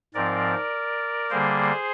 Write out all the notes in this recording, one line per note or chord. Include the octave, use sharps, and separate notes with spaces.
G#2 F3 C4 A#4 D5
D3 G3 A#3 G#4 C5